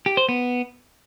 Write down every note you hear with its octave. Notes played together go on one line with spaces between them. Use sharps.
G4
C5
B3